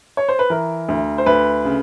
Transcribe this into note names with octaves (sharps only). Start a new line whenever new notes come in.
C#5
C5
B4
E3 A#4
D2
C5
D2 B4
C#3